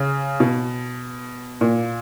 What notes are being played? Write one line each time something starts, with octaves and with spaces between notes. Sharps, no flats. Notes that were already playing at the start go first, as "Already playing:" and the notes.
Already playing: C#3
B2
A#2